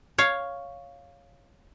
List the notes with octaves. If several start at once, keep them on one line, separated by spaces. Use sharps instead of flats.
C#5 F5